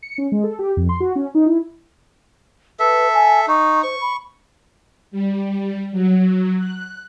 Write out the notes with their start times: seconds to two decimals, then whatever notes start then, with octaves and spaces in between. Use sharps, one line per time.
0.03 C#7
0.18 C#4
0.32 G#3
0.44 A4
0.59 G4
0.77 F2
0.89 C6
1.00 F#4
1.16 C#4
1.35 D#4
1.46 E4
2.80 A4 B4 E5
3.14 G#5
3.48 D#4 C#6
3.83 C5 C#6
4.01 B5
5.11 G3
5.91 F#3
6.58 F#6